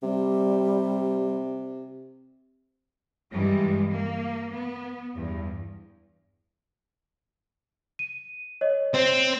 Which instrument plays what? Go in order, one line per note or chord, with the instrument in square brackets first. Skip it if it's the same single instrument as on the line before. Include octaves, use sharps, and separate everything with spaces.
[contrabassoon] C3 [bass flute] G3
[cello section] G2 E3 G3 G#3
A#3
B3
E2 G2
[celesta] D#7
C#5 D#5
[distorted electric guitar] C4